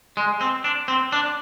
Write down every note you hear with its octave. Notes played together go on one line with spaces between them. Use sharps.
G#3
C4
D4
C4
D4